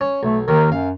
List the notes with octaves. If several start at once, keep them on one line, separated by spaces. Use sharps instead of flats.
C#4
B1 A3
D#2 D#3 A#4
F#2 F5